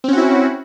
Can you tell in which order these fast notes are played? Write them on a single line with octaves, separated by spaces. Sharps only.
C4 C#4 F#4 E4